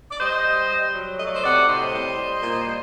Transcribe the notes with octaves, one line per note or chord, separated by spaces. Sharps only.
D5
G3 C5 D#5
G3
G3
F#3
A3 D#5
D5
C5 D#5
C3 D5 F#5
A2 C5 D#5
G3
G3
A#2
G3